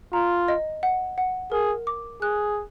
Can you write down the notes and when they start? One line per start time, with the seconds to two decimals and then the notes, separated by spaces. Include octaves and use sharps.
0.13 F4 A#5
0.48 D#5
0.83 F#5
1.18 F#5
1.52 G#4 A#4
1.87 D6
2.22 G#4 F#6